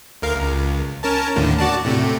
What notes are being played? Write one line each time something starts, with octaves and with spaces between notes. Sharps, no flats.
D2 A#4 F5
C#2
C#4 A#4 A5
D#2 A2 D3
F#4 D5 A5
A2 C3 A3